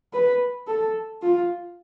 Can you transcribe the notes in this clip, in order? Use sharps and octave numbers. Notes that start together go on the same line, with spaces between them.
B4
A4
F4